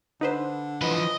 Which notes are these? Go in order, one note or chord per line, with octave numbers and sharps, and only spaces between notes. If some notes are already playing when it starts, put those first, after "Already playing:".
D3 D#4 B4 C5
E3 F3 B4 D#5